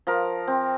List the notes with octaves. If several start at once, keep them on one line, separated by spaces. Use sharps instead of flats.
F3 A#4
C4